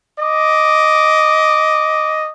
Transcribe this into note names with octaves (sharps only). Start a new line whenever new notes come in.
D#5 D6